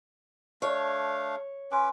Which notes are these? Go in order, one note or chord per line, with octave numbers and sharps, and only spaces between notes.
A3 D4 C#5 F5 C#6
C#4 B4 G#5 C6 D6